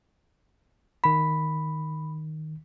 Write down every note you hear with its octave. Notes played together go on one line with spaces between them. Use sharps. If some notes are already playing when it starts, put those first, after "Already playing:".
D#3 B5 B6